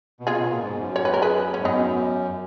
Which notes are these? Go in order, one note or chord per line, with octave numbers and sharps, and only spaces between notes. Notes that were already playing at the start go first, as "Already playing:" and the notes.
B2
C#3 F4 G#4
B2
A#2
G#2
F#2
C#5
B4
A#4
G#4 B4
C#4
G#2
F#2 B3 D#4